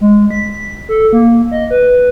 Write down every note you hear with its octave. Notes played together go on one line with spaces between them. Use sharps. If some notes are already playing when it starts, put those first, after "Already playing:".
G#3
B6
A4
A#3
D#5
B4